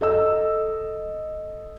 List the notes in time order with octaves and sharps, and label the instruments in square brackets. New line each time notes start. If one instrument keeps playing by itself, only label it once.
[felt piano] A4 D#5 E6